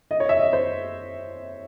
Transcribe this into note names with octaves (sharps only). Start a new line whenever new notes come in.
D#5
C#5
E5
D#5
C5